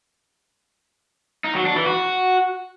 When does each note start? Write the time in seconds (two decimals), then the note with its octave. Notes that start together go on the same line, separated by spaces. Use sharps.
1.44 D#4
1.55 F#3
1.65 D4
1.76 E3
1.86 F#4